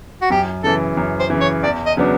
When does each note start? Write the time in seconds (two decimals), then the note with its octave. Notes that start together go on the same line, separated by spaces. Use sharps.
0.22 F#4
0.30 F#2 G4
0.64 C#3 E3 A4
0.97 F#2
1.19 C5
1.30 C#3 E3
1.41 C#5
1.63 E2 D5
1.86 D#5
1.97 C#3 F#3 B3 D4